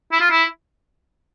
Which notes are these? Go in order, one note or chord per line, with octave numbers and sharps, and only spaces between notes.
E4
F4
E4